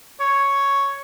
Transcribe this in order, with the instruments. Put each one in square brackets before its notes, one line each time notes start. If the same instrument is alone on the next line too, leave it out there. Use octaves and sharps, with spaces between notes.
[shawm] C#5